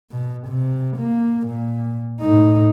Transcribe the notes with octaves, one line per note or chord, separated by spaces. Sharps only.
B2
C3
A#3
A#2
A2 D#4